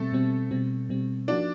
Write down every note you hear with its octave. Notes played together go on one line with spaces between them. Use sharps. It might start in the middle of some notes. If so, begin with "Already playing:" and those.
Already playing: B2 G3 A3 C4 A4
B2 G3 C4
B2 G3 C4
B2 G3 C4
F3 A#3 D4 D#4 F#4